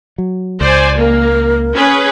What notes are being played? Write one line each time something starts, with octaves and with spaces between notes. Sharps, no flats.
F#3
C#2 C5 D5 G#5
A#3 A#4
C#4 G#4 B4